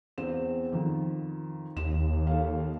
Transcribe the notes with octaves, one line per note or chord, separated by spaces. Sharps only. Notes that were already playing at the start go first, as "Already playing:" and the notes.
E2 C4 E7
F2 D#3
D#2 E7
A4 F5